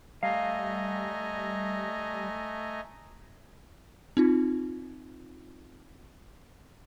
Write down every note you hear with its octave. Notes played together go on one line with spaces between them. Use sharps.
G3 A3 D#5 F5 G#5 A#5
C4 D#4 F4